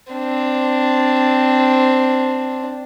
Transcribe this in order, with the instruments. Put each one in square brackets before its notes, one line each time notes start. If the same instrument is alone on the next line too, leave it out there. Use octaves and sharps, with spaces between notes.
[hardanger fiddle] C4 D4